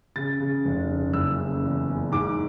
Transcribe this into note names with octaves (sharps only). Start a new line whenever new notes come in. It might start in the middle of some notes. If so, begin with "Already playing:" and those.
C#3 A6
C#3
F1
C#3
F#1 E6
C#3
E2
E2
G#2 D6